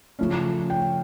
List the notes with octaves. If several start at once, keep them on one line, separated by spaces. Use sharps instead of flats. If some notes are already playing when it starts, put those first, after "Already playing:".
C#3 F3 A3 C#4
G5